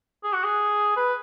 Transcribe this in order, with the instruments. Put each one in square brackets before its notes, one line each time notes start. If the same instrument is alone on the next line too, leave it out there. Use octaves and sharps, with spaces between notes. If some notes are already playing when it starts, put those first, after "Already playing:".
[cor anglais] G#4
F#4
G#4
B4